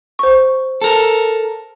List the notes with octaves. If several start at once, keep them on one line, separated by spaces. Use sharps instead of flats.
C5 C#6
A4 A#4